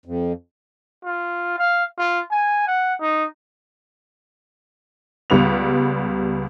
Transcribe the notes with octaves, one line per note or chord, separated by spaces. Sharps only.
F2
F4
F5
F4
G#5
F#5
D#4
C#2 G3 B3 F7